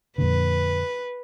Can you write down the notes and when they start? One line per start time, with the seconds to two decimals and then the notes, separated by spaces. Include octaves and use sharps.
0.18 F2 A#2 D3 B4